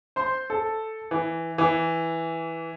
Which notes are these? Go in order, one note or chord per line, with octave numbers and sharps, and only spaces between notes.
C5 C6
A4
E3
E3